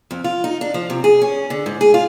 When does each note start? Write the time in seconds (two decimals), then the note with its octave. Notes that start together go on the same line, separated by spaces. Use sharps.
0.11 F2
0.24 F4
0.44 D#4
0.61 D4
0.74 F3
0.90 C3
1.04 G#4
1.22 C#4
1.50 D3
1.66 G#2
1.81 G#4
1.94 F4